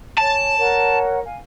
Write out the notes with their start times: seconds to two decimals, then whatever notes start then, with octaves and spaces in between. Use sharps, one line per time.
0.18 C#5 G#5 A5
0.58 A#4 C#5 F#5
1.24 F5 G#5